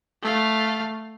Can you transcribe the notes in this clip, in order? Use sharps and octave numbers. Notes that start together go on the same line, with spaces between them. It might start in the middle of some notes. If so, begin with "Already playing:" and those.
A3 F5